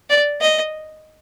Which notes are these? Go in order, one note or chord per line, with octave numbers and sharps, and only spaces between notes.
D5
D#5